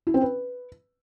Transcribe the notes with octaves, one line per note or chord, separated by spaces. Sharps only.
E4
C4
B4